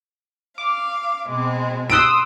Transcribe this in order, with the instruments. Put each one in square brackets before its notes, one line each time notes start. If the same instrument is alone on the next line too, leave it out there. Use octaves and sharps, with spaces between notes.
[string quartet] F5 [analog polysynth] D6
[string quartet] B2 G#3 C4
[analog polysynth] C6 D#6 E6 [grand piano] F#6 D7